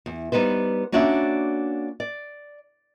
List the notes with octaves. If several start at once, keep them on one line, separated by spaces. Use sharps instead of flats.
E2
G3 B3 D#4 B4 C5
A#3 C#4 D4 F#4 D5 E5
D5